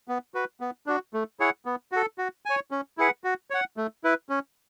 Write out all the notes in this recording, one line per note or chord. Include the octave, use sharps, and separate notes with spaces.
B3
F#4 B4
B3
D4 F#4
A3
E4 G#4 C#5 F#5
B3
F#4 A4
F#4
C#5 G#5
C#4
E4 G#4 B4 F#5
F#4
C#5 F#5
A3
E4 B4
C#4